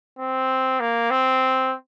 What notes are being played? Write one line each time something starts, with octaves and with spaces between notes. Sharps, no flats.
C4
A#3
C4